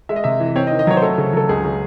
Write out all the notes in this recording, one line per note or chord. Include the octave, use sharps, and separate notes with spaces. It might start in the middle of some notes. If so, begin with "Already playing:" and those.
G#3 E5
D#5
C3 E5
E3
C4 C#5
D#5
D#3
D#5
F#3 C#5
C5
A3 A4
C#3
F#3 A4
C#2 G#4
C#3